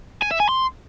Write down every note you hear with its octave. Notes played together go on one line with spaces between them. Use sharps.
G#5
E5
G#5
C6